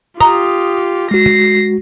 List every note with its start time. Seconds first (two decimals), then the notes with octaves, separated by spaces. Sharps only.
0.20 F4 G4 A#5 D#6
1.11 G#3 F#4 A#6 C7